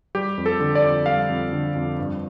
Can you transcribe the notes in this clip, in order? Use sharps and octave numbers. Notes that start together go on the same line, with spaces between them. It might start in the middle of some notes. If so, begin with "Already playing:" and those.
G3 G4
F2
A4
D3
D5
F2
G3 F5
F2
D3
F2
G2